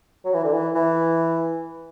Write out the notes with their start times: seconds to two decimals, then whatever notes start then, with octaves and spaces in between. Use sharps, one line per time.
0.25 F#3
0.34 E3
0.44 D3
0.53 E3
0.75 E3